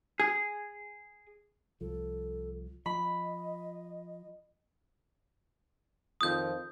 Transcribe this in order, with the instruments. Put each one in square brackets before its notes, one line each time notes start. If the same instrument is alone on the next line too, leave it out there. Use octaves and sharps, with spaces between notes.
[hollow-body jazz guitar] G#4
[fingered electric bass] C2 F3 [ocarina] A4
[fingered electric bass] F3 [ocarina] D#5 [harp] B5
[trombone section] F2 D#3 F3 [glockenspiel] D#6 G6